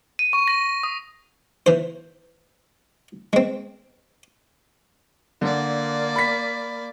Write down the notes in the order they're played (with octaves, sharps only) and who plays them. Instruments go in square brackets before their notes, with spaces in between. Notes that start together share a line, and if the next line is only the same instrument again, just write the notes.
[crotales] D#7
C#6
A#6
D#6
[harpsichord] E3 C5
G#3 C4
[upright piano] D3 [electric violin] A#3 D5
[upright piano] B5 B6